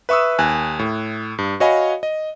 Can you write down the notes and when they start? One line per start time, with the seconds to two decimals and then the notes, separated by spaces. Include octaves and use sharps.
0.09 B4 E5 C#6 D#6 E6
0.39 D#2 G#5 F#6
0.79 A2
1.38 G2
1.60 F#4 C#5 D#5 F5 G#5 B5
2.03 D#5